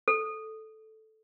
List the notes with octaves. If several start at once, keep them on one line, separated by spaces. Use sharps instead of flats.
A4